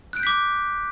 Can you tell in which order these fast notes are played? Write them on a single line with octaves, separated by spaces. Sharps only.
F#6 D7 G6 B6 D6